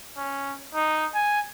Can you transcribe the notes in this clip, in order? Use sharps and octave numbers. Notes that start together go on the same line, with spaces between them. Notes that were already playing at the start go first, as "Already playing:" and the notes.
C#4
D#4
G#5